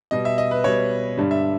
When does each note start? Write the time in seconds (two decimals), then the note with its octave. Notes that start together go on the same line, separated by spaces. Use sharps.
0.11 B2 G3 D#5
0.25 E5
0.38 D#5
0.51 B4
0.64 B2 G3 C#5
1.18 G2 D3 G3
1.31 E5